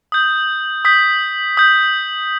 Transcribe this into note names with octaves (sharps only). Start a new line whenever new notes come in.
D#6 G6
D#6 G6 B6
D#6 G6